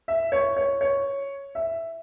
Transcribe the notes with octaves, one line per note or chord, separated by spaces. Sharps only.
E5
C#5
C#5
C#5
E5